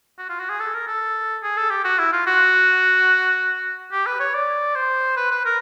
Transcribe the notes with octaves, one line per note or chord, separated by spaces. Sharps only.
F#4
F4
F#4
G#4
A4
A#4
A4
G#4
A4
G4
F#4
E4
F4
F#4
G4
B4
C#5
D5
C5
B4
B4
A#4